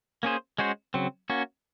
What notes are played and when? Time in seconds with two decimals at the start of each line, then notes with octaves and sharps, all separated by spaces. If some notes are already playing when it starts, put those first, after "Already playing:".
0.23 A#3 C#4 G#4 C5
0.58 G#3 C#4 F#4 C5
0.94 C#3 F#3 C4
1.30 A#3 C#4 F#4